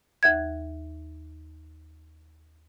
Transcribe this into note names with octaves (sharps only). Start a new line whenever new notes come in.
D#2 E5 G#6